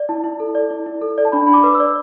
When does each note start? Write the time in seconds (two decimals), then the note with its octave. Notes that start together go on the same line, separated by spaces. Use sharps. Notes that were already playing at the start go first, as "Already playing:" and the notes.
Already playing: D5
0.09 E4 A5
0.24 E4
0.40 A4
0.55 D5
0.71 E4
0.86 E4
1.01 A4
1.18 D5
1.25 A5
1.32 D4 B5
1.47 D4 B5
1.53 D6
1.63 B4
1.75 E6
1.80 D5